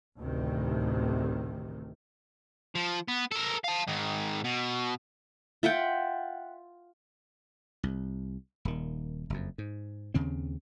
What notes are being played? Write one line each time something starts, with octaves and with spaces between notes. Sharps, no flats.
A1 D2 A2 C3 D#3
F3
B3
A4 A#4
F5 A5
G#2 D#3
B2
F4 E5 F#5 G5
C2
D#1 D#3
F#1 F2
G#2
D#2 C#3 C4